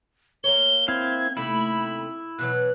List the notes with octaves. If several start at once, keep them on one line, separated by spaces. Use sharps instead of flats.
A#3 C#5 G7
C4 E4 F5 G#6
D#2 C3 A3 E4 B5
B2 E3 F#3 F#6